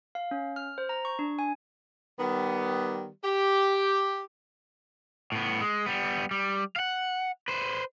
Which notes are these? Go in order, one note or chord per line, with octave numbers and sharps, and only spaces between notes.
F5
C#4
F6
C5
A#5
C#6
D4
G#5
D#3 G3 B3
G4
A2 B3
G#3
G3 B3
G3
F5 F#5
B4 C5